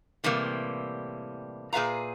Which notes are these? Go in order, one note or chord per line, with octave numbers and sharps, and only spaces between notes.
A2 C3 E3 G3 A#3
A#2 G#4 B4 E5 F5 A#5